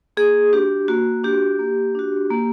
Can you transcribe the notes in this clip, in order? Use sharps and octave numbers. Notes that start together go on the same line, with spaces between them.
A#3 G#4
D4 F#4 G4
A#3 F#4
D4 F#4 G4
A#3
D4 F#4
A#3